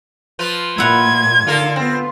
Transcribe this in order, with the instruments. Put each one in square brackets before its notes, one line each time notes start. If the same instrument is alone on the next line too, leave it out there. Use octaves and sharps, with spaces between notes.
[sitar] F3 F4 B4
[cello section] A#2 [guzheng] E4 F#5 A#5 [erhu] G#6
[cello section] D3 D#4 F5 [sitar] F4 A4 A#4
[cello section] B3 F4 [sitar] C4